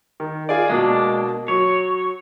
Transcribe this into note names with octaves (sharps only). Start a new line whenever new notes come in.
D#3
F4 G#4 D5
B2 G#3 A#3 D4
F#3 C#5